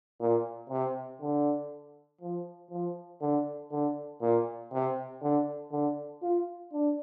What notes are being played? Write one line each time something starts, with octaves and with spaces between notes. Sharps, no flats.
A#2
C3
D3
F3
F3
D3
D3
A#2
C3
D3
D3
F4
D4